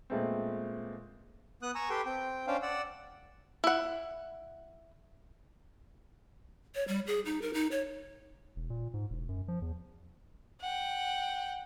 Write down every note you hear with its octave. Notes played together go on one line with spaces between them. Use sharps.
A#2 G#3 A3 B3 C4
B3 D#6 F#6
G#5 A#5 C#6 E6
G4 A4 B4 G5 C6
C4 G5
C#4 D4 C5 F5 G5
D5 F#5 E6
E4 F#5
C#5
G3
G#4
D#4
A#4
D#4
C#5
E1
A#2
G#2
E1
F#2
F3
E2
F#5 G5